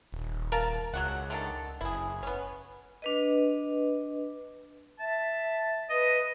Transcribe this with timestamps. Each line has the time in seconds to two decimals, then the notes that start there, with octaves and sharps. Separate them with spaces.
0.12 D#1
0.52 A#4 F5 A5
0.94 C#2 F#3 F#4 F#5
1.30 D3 D#3 A4
1.81 F#1 E4 G#4
2.23 B3 C#4
3.02 D4 B4 D#5
5.00 E5 A5
5.90 B4 D#5